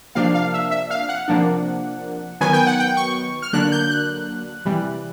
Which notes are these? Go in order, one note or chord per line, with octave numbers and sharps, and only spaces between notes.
C3 F3 A#3 D4 F5
F5
E5
E5
F5
F#5
C3 F3 A#3 D4
D#3 F#3 B3 G#5
G5
F#5
G5
C#6
F6
D3 F#3 A#3 D4 F#6
G6
F#6
C3 E3 G3